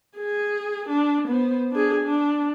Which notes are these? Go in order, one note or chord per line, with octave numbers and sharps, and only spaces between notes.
G#4
D4
B3 C5
D4 G#4
D4